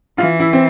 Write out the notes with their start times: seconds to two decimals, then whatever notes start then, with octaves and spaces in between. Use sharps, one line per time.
0.18 E3 F4
0.40 E4
0.53 C4